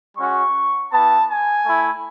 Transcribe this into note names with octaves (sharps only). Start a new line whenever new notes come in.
G#3 C#4 F#4 C#6
B3 E4 A5
G#5
A3 E4